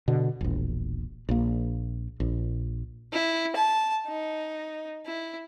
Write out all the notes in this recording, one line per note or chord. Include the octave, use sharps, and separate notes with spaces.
B2 D3
E1 A#1
A#1 A#3
A#1
E4
A5
D#4
E4